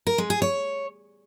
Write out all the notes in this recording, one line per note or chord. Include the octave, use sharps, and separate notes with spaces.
A#4
G#3
G#4
C#5